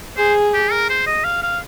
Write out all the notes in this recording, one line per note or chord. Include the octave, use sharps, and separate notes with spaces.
G#4 C5
G4
A#4
C5
D#5
F5
F5